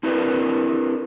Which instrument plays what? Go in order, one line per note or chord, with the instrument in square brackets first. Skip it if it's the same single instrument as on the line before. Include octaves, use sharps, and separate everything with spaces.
[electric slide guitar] C4 D4 E4 G4 A#4 B4